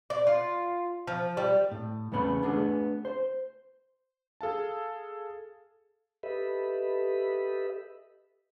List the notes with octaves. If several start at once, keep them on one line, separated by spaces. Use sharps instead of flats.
D5
F4
F3
G3
A2
E2 C#3 A3 B3 B5
A3 B3 D4 G#4
C5
G#4 A4 F5 A5
G4 A4 B4 D#5 E5 B5